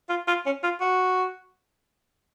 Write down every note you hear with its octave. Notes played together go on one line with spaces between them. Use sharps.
F4
F4
C#4
F4
F#4